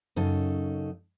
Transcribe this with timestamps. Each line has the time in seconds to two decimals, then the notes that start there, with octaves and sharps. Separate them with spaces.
0.16 F#2 C#3 D#4 A4 A5